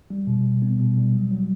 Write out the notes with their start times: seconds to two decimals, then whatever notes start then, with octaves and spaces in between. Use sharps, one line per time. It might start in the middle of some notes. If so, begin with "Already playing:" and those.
0.10 G3
0.27 B2
0.44 B2
0.62 B3
0.79 B2
0.97 G3
1.14 F#3
1.31 F#3